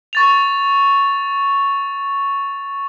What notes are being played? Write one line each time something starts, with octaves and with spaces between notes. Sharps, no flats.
C#6 A6 F7